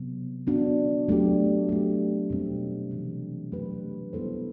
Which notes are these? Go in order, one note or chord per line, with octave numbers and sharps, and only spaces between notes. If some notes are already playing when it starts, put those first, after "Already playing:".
Already playing: C3 F#3 B3
B3 D4 F#4
F#3 A3 D4 G4
A3 C4 G4
B2 G3 C4
C3 E3 G3 D4
F#3 A3 D4 G4 B4
G3 B3 E4 A4 C5